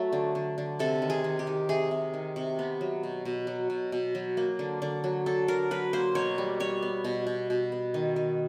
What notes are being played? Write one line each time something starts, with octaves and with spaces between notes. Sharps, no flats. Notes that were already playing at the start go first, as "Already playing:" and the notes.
Already playing: F#3 A3
D3
D3
D3
C3 A4
D#3
G#4
D#3
G4
D#3
C3 G#4
C3
D#3
C3
B3
F#3
B2
B2
F#3
B2
B2
F#3
A#3
D3
D3
F#3
D3 A4
D3 A#4
F#3 B4
A#3 C5
B2 C#5
G3
G3 C#5
B3
B2
B2
B2
B3
D#3
D#3